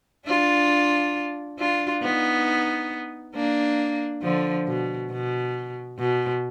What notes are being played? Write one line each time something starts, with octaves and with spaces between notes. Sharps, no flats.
D4 F4
D4 F4
B3 D#4
A#3 D4
D3 F3
B2
B2
B2